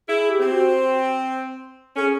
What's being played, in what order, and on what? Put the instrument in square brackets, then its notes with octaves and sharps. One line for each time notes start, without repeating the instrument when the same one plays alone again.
[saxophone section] E4 [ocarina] G#4
[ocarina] G4
[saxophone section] C4
[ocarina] F#4
[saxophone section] C#4 [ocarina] A4
[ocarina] G#4